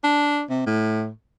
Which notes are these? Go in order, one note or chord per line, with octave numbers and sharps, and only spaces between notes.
D4
C3
A2